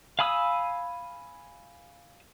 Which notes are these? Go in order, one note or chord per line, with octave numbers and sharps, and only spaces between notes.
F5 G#5 B5 D#6 E6